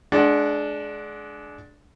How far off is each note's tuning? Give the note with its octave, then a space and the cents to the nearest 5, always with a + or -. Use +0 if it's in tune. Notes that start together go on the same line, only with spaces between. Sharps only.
G#3 +30 D4 +0 F#5 +0